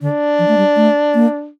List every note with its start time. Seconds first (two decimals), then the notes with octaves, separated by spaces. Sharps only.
0.01 D3 D4
0.39 F3
0.48 A3
0.57 G3
0.76 A3
1.14 A#3